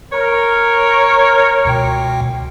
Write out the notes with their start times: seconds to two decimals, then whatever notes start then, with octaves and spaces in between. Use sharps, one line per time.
0.12 A#4 C#5
1.65 C#2 B2 G5